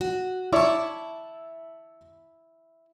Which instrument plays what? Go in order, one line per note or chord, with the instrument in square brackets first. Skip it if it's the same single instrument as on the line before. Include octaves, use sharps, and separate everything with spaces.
[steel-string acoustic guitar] F#4
[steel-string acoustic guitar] E4 A5 [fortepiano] C#5 D5 E5